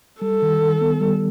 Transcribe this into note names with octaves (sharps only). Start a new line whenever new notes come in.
G3 A4
D#3
D#3
B3
G3